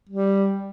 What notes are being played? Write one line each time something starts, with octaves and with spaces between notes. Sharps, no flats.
G3